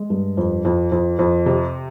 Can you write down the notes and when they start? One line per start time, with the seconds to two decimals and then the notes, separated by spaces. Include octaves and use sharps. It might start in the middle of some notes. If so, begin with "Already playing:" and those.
Already playing: G#3
0.10 G2
0.37 F2
0.65 F2
0.92 F2
1.19 F2
1.46 C3